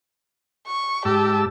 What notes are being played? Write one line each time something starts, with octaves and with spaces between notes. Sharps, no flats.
C#6
G#2 G4 A5 E6